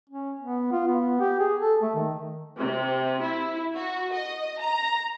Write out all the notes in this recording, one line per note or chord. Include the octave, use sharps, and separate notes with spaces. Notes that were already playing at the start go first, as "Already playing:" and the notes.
C#4
B3
F4
B3
G4
G#4
A4
A3
D#3
C3
E4
F#4
D#5
A#5